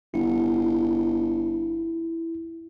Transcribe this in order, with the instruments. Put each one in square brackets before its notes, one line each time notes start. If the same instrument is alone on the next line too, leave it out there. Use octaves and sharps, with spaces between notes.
[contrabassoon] G1 [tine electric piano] E4